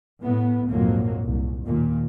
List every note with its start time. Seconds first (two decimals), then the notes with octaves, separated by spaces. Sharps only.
0.21 A2 B3
0.70 A#1 F2 G#2 F#3 A#3
1.23 C2
1.65 D#2 A#2